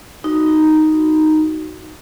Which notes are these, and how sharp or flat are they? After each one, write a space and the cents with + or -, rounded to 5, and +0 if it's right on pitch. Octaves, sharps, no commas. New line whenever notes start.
D#4 +0 F#4 +10